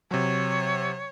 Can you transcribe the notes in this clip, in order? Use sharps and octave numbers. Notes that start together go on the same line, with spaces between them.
C3 F#3 C#5